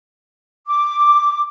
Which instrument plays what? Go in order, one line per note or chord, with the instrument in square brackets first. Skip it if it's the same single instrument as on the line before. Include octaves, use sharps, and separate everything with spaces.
[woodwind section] D6